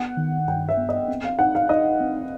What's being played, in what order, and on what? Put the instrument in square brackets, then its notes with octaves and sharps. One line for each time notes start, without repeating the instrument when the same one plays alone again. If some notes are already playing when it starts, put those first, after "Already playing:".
Already playing: [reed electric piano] B3 [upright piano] F#5
[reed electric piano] D#3
[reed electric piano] G2 [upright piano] G5
[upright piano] E5
[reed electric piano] B3
[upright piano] D#5
[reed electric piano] C4
[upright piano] F5
[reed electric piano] D#4 [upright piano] F#5
[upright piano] F5
[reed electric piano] D#4 [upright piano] D#5
[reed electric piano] C4